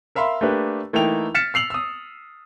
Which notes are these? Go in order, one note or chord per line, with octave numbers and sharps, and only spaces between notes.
A#4 E5 F5 B5 C6
A3 A#3 D4 G4 B4
E3 A3 A#3 D#4 G5 F7
F6 A6 B6 C#7 E7
E6 C7 F7 F#7
D#6 E6